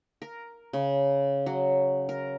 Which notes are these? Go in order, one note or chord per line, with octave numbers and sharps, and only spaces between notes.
A#4
C#3
F#3
A#4